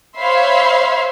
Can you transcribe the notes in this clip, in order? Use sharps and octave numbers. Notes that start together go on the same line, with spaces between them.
C5 C#5 E5 F5 B5 C6